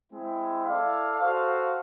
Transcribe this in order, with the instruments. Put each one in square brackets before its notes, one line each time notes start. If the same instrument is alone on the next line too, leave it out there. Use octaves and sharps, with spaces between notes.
[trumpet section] G#3 C4 E4
E4 A4 D5 F5
F#4 A4 C5 F5